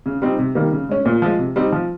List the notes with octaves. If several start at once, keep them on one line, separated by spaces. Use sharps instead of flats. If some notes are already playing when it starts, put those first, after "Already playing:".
C#3
G3 C4 D#4
C3
D#3 G3 A#3
C#3
G#3 C#4
A#2
F3 G#3
C3
G3 C4 D#4
F3